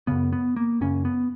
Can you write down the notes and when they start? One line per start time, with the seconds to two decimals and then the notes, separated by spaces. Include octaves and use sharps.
0.07 F#2 C#3 B3
0.33 B3
0.56 A#3
0.81 F#2 C#3 C#4
1.05 B3